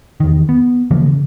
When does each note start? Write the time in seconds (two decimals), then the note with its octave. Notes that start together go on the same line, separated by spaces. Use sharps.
0.20 E2 D#3
0.49 B3
0.91 C#3 E3 F3 A#3
1.06 C#3